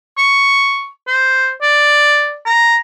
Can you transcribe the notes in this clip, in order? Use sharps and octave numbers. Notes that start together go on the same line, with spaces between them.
C#6
C5
D5
A#5